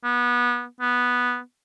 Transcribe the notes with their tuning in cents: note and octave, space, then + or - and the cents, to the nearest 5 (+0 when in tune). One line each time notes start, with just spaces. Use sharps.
B3 -25
B3 -5